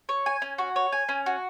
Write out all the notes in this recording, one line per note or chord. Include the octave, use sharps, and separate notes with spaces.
C#5
G#5
C#4
F#4
C#5
G#5
C#4
F#4